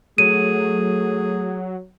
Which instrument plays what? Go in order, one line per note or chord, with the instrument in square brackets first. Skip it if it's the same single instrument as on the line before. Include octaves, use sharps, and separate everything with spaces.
[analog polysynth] F#3 [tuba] A3 [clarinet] G#4 [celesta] D#7